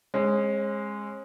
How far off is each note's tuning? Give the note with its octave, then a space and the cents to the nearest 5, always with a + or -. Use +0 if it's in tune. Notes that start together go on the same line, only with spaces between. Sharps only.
G#3 -10 C#4 -45